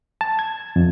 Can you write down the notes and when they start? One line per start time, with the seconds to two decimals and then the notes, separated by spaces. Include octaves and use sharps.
0.21 A5
0.39 G#6
0.76 F2